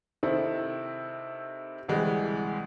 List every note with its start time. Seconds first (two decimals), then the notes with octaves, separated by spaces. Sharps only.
0.23 C3 D#3 C4 E4 A4
1.88 D2 C3 E3 G3 G#3